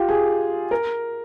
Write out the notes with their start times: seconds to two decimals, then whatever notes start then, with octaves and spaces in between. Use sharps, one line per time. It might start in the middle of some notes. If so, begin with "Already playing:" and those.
Already playing: F4 G4
0.09 G#4
0.71 A#4